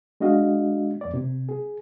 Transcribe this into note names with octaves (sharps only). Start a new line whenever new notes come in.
G#3 D4 F#4 D#5 F5
F2 D5
C3
G#4